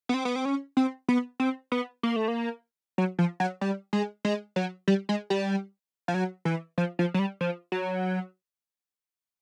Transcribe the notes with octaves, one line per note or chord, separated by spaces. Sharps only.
B3
C4
B3
C4
C#4
C4
B3
C4
B3
A#3
A3
A#3
F#3
F3
F#3
G3
G#3
G#3
F#3
G3
G#3
G3
F3
F#3
E3
F3
F3
F#3
G3
F3
F#3